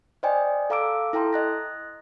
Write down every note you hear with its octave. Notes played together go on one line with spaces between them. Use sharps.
C5 D5 D#5 G5 G#5
A4 F5 A#5 D6 E6 D7
E4 A4 G5 A#5 C6
D#5 F#6 A#6